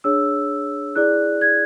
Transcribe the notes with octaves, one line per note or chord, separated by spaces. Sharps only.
D4 G#4 C#5 E6
E4 G#4 D5 F#6
G#6